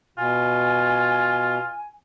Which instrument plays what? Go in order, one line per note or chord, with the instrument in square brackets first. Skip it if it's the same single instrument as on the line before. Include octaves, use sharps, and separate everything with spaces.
[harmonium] B2 [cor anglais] F4 [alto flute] G#5